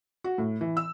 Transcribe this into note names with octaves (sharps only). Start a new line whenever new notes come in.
F#4
A2
E3
E6